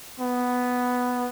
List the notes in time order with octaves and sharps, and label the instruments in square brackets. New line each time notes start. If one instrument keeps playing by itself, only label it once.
[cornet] B3